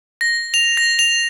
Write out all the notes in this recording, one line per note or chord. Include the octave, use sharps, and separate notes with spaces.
A#6
F7
A#6
F7